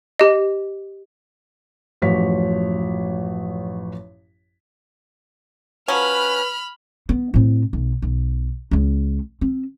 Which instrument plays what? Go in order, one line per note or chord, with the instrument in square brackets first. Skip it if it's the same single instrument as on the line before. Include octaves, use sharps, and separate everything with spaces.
[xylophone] G4 D#5
[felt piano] A1 F#2 F3 C#5 B6
[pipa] F3 F#3 C#4 [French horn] B4 [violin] B5 F6
[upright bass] B3
A2 C4
B1
B1
C#2 C#3
C4